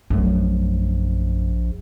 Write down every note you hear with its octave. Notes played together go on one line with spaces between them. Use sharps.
A#1 F#2 A3